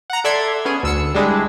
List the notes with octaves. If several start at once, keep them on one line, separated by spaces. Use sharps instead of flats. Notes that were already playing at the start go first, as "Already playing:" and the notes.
F#5 A#5
A4 D5 E5 C6 G#6
B3 C#4 G#4
D2 E6 C#7
G3 G#3 D4 E4 G#4